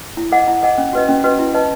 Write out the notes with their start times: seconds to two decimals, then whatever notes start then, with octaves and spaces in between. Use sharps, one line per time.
0.17 E4
0.32 A4 D#5 F#5
0.48 E4
0.63 A4 D#5 F#5
0.78 C#4
0.93 F#4 B4 D#5
1.09 C#4
1.24 F#4 B4 D#5
1.39 E4
1.54 B4 D#5 A5